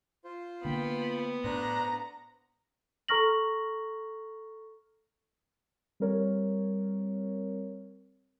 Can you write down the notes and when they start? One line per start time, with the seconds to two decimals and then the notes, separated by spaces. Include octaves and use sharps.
0.24 F4 C5
0.65 D3 A#3 B3 G5 B5
1.44 A2 D4 C5 A#5 F#6
3.08 A4 A#5 C#6 F6 A#6 F#7
6.00 G3 C4 A#4 C#5